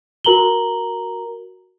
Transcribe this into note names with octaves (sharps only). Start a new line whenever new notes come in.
F#4 A#4 A#5 F#7 G7